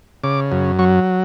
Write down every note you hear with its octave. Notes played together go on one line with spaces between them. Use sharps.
C#3 D6
F#2
F#3 C#6